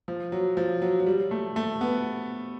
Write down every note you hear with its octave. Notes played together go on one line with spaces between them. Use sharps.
F3
F#3
F3
F#3
F#3
G3
A3
A3
B3